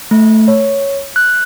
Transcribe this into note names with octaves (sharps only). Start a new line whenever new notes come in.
A3
C#5
F#6